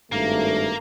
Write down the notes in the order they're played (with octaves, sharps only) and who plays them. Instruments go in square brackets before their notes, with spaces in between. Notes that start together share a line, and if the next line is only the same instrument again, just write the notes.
[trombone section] G#1 G2 A3 [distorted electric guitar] A#3